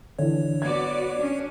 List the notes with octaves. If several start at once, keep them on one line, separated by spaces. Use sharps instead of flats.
D3 E3 C#5
B3 F#4 D5 G#6
C#4 D4